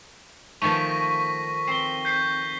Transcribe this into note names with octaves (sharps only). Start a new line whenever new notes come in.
D#3 F3 A3 C#6 B6 D#7
A#6
C4 C7 G7
G6 B6 C7